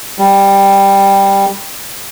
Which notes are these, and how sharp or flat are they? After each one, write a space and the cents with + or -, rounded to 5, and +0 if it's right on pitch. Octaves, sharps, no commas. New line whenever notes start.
G3 +5